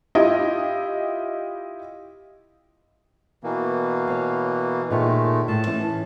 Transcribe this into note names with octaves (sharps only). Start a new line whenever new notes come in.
E4 F4 G4 D#5
B2 E3 A#3
C#5 F5
A#2 D#3 G#3 A3 F4 C#5
A2 A5
E3 C#4